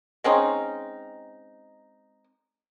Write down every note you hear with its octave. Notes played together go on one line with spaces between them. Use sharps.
G#3 C4 C#4 D#4